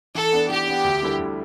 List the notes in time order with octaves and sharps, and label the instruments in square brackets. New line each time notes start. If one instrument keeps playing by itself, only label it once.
[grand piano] E3 [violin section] A4
[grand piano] B3 D4
[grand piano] E3 [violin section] G4
[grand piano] B3 D4
D2
D3 G3 E4 A4
D2